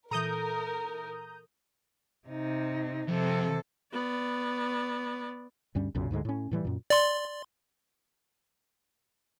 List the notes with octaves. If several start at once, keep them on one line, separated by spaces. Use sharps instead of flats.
A#2 E3 A4 A#4 A#5 D#6 G6
C3 D#4
F2 C3 A4
B3 D5
D2 G2 G3 C#4
B1 F#2 A#2 C#3
D2 G#2 D3 G#3
A2 C#4
A2 E3 G3
F#2 A#2
D5 C6